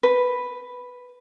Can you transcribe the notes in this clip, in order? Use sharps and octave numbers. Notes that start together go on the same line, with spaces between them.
B4